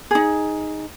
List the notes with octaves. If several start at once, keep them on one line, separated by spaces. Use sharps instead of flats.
D#4 G#4